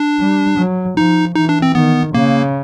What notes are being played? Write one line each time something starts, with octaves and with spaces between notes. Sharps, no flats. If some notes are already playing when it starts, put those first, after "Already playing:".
Already playing: D4
G3
F#3
F3 D#4
E3 D#4
D4
C4
D#3 B3
C#3 A#3